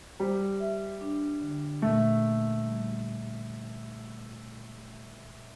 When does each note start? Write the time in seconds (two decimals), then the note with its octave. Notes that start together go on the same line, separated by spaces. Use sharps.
0.20 G3 C5
0.60 E5
1.01 D4
1.41 D3
1.82 A#2 A3
2.22 A#3
2.63 G3